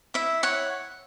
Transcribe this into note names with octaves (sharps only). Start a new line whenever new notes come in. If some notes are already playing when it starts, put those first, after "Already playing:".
E4 E5
C#5 F#5